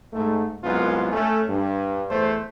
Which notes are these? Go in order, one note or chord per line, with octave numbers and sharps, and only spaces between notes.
G#2 A3
C2 F#2 G#3 B3 F4
A3 C#4
G2
E2 A3 C5